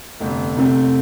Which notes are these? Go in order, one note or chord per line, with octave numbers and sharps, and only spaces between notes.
G1 F2 C3 A3
C2 C3 A3 C4